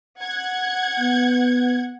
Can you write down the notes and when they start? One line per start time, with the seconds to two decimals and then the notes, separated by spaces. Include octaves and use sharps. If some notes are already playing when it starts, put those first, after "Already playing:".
0.21 F#5 G#6
0.99 B3